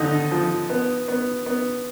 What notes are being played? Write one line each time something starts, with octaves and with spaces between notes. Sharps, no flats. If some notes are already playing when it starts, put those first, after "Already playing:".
Already playing: D#2 D3 D#4
F3
B3
B3
B3